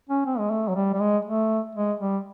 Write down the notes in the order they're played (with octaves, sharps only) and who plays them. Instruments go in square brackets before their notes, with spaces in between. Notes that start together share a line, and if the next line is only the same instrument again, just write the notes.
[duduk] C#4
C4
G#3
A3
F#3
G3
G3
G#3
A3
G#3
G3